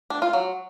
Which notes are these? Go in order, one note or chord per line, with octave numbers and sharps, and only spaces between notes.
D4
F4
F#3